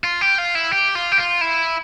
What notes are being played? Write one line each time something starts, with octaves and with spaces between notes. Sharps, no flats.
F4
G4
F4
E4
G4
F4
G4
F4
E4